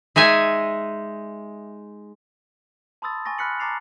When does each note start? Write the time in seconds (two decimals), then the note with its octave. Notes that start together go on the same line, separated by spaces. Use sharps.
0.16 G#3 D#4 E5 G#5
3.02 A5 B5 C6 D#6 E6 A6
3.26 G#5 C#6 A6 A#6
3.38 B5 F6 F#6 B6 C#7 F#7
3.60 A5 A#5 D6 A6 C7 F7